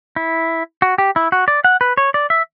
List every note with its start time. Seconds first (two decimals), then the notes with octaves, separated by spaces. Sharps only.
0.16 E4
0.82 F#4
0.98 G4
1.16 E4
1.32 F#4
1.48 D5
1.64 F#5
1.81 B4
1.97 C#5
2.14 D5
2.30 E5